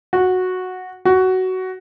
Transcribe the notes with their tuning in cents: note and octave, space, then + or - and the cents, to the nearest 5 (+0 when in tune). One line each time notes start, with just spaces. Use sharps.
F#4 -5
F#4 +15